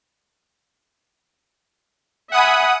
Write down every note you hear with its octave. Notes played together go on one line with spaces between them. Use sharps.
E5 F#5 G#5 B5 D#6